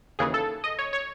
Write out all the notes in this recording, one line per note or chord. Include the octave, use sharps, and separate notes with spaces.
D#2 C#3 E3 G#4
A4
D#5
C#5
C#5